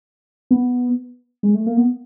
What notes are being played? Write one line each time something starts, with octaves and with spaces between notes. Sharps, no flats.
B3
G#3
A3
A#3
B3